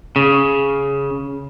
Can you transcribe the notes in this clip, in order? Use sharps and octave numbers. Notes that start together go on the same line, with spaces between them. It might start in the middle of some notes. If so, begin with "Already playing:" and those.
C#3